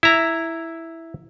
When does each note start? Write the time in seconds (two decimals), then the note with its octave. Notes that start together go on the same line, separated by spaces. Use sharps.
0.03 E4 A#5